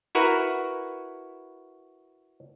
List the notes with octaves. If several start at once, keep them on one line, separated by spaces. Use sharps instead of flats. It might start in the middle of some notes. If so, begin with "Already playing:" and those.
E4 F#4 A#4 B4